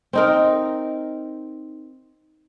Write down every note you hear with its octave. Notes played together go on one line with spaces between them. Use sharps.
C4 D#4 A#4